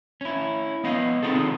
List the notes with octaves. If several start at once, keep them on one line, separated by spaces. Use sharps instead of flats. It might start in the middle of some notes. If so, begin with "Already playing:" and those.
C#4 E4
B3 D#5 F5
C4 D#4 F4 G#4 A4